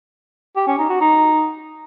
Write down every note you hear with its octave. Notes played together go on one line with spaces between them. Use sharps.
G4
C#4
D#4
F#4
D#4